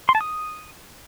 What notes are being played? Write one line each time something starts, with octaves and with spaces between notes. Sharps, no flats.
C6
A5
D#6